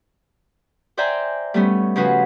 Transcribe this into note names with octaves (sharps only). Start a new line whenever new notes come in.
C5 D5 E5 G5 G#5 A#5
G3 A3 B3 C#4
C#3 F3 C#4 F#4 B4